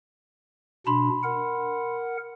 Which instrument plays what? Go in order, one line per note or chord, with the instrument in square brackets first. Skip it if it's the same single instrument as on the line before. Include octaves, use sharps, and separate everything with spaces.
[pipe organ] B2 D4 [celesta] B5 C6
[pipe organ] A#4 F#5